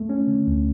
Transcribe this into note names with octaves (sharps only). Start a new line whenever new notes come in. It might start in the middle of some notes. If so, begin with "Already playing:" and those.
Already playing: A3
C#4
D3
D2